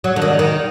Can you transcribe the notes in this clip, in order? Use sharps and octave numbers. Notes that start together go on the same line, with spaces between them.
F#3
D3
D#3
D#3